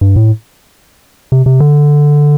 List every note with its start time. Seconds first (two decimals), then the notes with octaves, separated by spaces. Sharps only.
0.01 G2
0.16 A2
1.32 C3
1.46 C3
1.60 D3